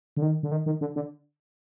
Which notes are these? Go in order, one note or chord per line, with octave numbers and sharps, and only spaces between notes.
D3
D#3
D3
D#3
D#3
D3
D3